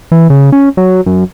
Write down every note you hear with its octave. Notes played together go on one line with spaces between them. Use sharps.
E3
C#3
C#4
F#3
F#2